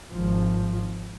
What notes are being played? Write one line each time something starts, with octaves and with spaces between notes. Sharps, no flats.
G#1 F3